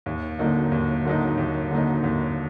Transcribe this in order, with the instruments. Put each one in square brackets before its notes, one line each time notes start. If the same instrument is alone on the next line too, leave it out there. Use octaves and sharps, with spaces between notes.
[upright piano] D#2
D3 F#3 A#3 D#4
D#2
D3 F#3 A#3 D#4
D#2
D3 F#3 A#3 D#4
D#2